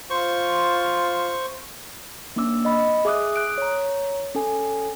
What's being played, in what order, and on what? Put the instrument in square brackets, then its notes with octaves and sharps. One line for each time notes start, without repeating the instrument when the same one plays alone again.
[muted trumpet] F4 [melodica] C5 C#6
[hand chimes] A#3 C#4 D4 D6 E6
D#5 B5
G#4 E5 D6 D#6 F#6
D#6 F#6 D7
C#5 A#5
C#4 A4 G#5